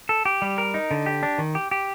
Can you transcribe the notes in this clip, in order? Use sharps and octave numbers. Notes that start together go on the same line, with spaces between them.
A4
G4
G3
A#4
D#4
D3
G4
D4
D#3
G4
G4